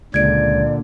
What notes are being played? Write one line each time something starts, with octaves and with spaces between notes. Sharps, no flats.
C#2 A#2 D3 D5 G#6 D7